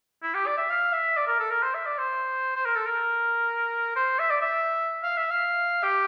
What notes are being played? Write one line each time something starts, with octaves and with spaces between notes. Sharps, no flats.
E4
G4
D5
E5
F5
E5
D5
A#4
A4
A#4
C5
E5
D5
C5
C5
A#4
A4
A#4
C5
E5
D5
E5
F5
E5
F5
G4